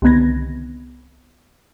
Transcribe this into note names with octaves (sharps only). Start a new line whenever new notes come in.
C2 D3 D#3 B3 G#6 A#6